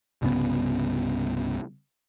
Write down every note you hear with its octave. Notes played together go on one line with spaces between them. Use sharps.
C2 G2 C#3 B3